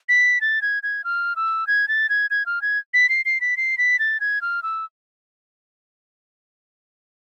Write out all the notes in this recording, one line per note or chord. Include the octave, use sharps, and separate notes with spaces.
B6
A6
G#6
G#6
F6
E6
G#6
A6
G#6
G#6
F6
G#6
B6
C7
C7
B6
C7
B6
A6
G#6
F6
E6